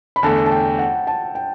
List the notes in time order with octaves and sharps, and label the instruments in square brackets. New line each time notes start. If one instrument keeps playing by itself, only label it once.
[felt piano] B5
[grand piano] E2 D3 A3 [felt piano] A5
[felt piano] A5
G5
F#5
A5
G5